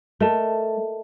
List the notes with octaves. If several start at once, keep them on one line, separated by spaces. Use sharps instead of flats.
A3 A#4 D#5 A5